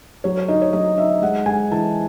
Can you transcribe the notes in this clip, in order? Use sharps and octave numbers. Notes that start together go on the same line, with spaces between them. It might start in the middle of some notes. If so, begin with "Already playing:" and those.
F#3 C#5
C#5
D#4 D#5
C#5
F#3 D#5
D#4 E5
G#3 F#5
G#3 G#5
E3 A5